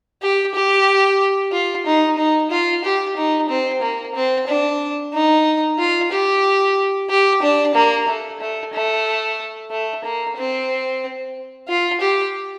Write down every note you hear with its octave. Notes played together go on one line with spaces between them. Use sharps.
G4
G4
F4
D#4
D#4
F4
G4
D#4
C4
A#3
C4
D4
D#4
F4
G4
G4
D4
A#3
A3
A3
A3
A3
A#3
C4
F4
G4